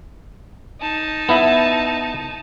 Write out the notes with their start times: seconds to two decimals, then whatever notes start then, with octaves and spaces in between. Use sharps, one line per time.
0.81 D#4 A5
1.29 B3 E4 E5